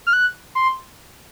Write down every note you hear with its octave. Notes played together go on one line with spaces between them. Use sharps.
F6
F#6
C6